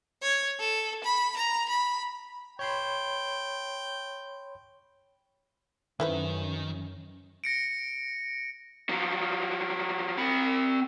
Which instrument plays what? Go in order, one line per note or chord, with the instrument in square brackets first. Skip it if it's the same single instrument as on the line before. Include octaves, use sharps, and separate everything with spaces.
[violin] C#5
A4
B5
A#5
B5
[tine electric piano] C#5 B5 C6 [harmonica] G5
[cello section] F#2 C#4 [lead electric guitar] D#3 [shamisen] E4 B4 C5
[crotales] A#6 C#7 D7
[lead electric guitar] F3 F#3
C4 B5